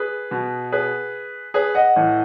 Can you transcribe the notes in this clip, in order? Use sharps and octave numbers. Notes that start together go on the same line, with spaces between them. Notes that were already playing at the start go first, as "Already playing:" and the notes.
Already playing: G#4 B4
B2
G#4 B4
G#4 B4
D#5 F#5
A2 E3